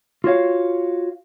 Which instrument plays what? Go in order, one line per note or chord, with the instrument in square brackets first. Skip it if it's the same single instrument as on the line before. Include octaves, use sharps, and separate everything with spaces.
[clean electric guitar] F4 F#4 C#5 F5